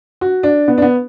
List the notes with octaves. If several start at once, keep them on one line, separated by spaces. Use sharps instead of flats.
F#4
D4
B3
D4
B3